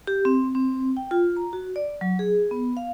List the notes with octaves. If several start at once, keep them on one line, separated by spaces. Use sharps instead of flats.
G4
C4
C4
G5
F4
A#5
F#4
D5
F#3
G#4
B3
F5